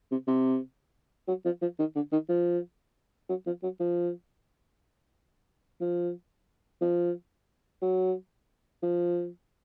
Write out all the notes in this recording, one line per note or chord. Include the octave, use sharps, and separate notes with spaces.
C3
C3
F#3
F3
F3
D#3
D3
D#3
F3
F#3
F3
F#3
F3
F3
F3
F#3
F3